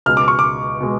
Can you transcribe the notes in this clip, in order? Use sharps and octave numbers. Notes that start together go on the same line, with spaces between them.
C#2 B2 G#3 F6
D6
C#6
D6
B2 G#3